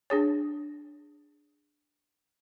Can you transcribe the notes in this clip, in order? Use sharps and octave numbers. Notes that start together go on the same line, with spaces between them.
D4 G#4 C#5